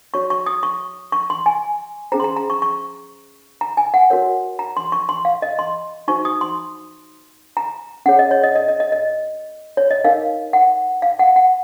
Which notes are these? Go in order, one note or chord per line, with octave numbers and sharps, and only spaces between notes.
F#4 C#5 C#6
C#6
D#6
C#6
C#6
C6
G#5
C#4 G#4 C5 A#5
C6
A#5
A#5
C#6
C#6
A#5
G#5
F#5
F#4 A#4 C#5
A#5
C6
C#6
C6
F5
D#5
C6
D#4 F#4 C5 C#6
D#6
C6
A#5
C#4 G#4 C#5 F#5
D#5
C#5
D#5
D#5
D#5
D#5
D#5
C#5
D#5
D#4 A#4 C#5 F5
F#5
F5
F#5
F#5